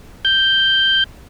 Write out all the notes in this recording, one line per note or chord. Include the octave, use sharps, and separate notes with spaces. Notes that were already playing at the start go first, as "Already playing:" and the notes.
G6